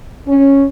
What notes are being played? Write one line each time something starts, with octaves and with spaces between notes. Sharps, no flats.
C#4